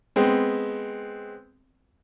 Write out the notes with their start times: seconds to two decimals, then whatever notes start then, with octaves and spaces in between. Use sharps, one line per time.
0.16 G#3 B3 C4